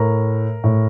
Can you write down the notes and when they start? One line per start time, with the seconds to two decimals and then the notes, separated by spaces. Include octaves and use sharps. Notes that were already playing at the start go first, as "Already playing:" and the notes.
Already playing: A2 A#4
0.64 A2